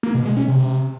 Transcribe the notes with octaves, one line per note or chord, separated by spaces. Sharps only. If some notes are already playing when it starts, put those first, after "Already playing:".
A#3
B2
G#3
C#4
C3